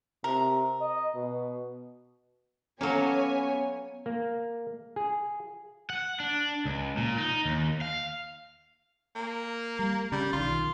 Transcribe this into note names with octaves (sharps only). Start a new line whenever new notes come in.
C3 A#4
D#5
B2
F#3 A#3 B3 C#4 A4 C#5 G#5
A#3
G#4
F#5
D4
C#2
A#2
D#4
D#2
F5
A#3
G3
C#3 G3
B1 D#3 F4